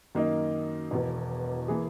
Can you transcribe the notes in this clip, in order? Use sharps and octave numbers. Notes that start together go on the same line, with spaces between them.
F#2 D#3 A#3 D#4
E1 E2 B2
E3 A#3 E4 G#4